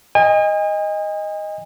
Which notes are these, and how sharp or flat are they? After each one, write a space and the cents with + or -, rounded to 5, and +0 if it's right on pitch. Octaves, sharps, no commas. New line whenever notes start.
D#5 +0 G#5 -40